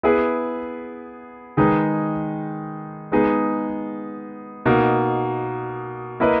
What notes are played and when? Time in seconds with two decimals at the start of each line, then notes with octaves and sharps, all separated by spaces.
0.03 B3 E4 G#4 B4
1.57 D#3 G#3 D#4 G#4 B4
3.12 G#3 B3 D#4 G#4
4.66 B2 A#3 D#4
6.20 A#3 E4 B4 D#5